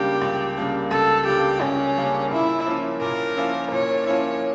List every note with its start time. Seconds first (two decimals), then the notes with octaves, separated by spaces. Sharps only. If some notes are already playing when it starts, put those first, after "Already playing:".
Already playing: C#2 C#3 G3 A#3 D4 G4
0.22 C#2
0.57 C#3 G3 A#3 D4
0.91 C#2 A4
1.27 C#3 G3 A#3 D4 G4
1.61 C#2 C#4
1.97 C#3 G3 A#3 D4
2.31 A#2 E4
2.67 F3 A#3 C#4 E4
3.01 A#2 A#4
3.37 F3 A#3 C#4 E4
3.71 A#2 C#5
4.06 F3 A#3 C#4 E4 C#5